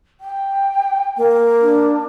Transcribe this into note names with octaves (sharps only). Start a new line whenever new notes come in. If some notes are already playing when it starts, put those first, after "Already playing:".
G5
A#3
D4